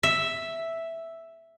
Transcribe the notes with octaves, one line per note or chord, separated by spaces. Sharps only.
E5